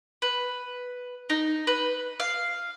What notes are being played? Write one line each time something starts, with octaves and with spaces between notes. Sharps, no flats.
B4
D#4
B4
F5